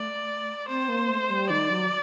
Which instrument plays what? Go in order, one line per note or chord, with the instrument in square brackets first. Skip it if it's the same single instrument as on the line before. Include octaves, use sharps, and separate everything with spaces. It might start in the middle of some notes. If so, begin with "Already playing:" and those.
Already playing: [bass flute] A3 [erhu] D5
[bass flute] C4 [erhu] C5
[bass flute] A#3
A3
G3
[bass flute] D#3 [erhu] D5
[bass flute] F#3